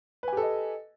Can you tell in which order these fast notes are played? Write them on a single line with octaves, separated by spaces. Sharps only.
B4 G#5 G4 A4 D#5